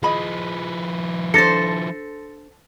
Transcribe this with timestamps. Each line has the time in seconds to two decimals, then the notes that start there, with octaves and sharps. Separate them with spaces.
0.03 F3 E4 G#4 D#5 B5
1.34 D4 A4 C5 A6 A#6 C#7